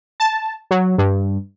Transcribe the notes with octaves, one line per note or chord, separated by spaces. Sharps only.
A5
F#3
G2